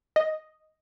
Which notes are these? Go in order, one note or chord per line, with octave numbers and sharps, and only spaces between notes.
D#5